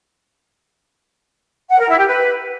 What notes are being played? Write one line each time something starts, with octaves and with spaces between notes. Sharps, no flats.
F#5
A#4
E4
G4
B4